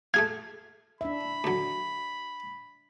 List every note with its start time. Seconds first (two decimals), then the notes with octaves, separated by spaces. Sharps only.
0.14 A3 G#4 F5 G#6
1.01 D4 E5 B5
1.44 D2 F#3